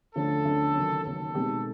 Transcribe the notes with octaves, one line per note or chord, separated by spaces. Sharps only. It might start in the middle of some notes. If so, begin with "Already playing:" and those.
D2 D3 F3 A3 C#4 A4
D2 D3 F3 A3 C#4
D#2 C#3 F#3
D#2 C#3 F#3 A4
B2 G#3 C4 D#4 G4